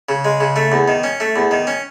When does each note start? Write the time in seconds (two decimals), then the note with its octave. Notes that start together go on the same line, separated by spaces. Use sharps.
0.09 C#3
0.25 G#3
0.40 C#3
0.56 A3
0.72 E2
0.88 D#3
1.04 C#4
1.20 A3
1.36 E2
1.51 D#3
1.67 C#4